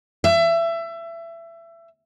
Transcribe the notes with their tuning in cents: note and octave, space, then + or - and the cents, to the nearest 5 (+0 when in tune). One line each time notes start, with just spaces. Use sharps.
E5 +25